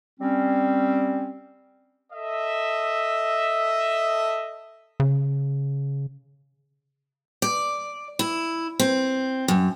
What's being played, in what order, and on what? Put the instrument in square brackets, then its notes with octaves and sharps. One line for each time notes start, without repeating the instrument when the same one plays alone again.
[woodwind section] G3 C4 C#4
[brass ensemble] A4 D#5 E5
[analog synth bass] C#3
[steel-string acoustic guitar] D5
E4
C4
F#2